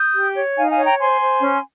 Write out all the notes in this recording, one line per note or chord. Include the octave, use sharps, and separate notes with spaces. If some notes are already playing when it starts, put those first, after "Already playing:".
Already playing: D#6 G6
G4
C#5
D#4 F5 G#5
F5 G#5
C#5
G5 A#5
C5 G#5 C6
C5
C#4